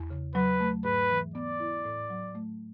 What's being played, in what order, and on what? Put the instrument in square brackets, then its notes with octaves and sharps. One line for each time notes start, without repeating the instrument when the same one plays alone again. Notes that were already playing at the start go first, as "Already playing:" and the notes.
Already playing: [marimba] E2
C#3
[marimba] F#3 [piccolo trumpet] B4
[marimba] A3
[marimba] G#2 [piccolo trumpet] B4
[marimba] E3
[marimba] B3 [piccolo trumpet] D5
[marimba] E4
A2
F#3
A3